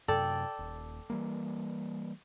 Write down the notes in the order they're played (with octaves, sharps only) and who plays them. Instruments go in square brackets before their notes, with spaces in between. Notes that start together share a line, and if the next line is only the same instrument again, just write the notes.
[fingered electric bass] F#2 C3 [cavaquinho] A4 D5 G5
[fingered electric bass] D#1
E3 G3 A#3